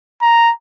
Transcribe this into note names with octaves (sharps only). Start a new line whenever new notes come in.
A#5